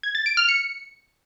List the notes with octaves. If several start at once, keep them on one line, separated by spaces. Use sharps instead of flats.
G#6
A6
D7
F6
C#7